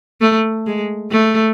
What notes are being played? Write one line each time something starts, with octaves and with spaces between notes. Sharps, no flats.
A3
G#3
A3